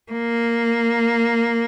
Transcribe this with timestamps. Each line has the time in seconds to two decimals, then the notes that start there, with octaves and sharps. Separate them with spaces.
0.12 A#3